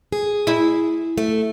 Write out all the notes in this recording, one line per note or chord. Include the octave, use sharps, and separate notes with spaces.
G#4
E4
A3